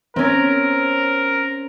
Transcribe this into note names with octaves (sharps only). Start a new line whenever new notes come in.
C4 C#4 A#4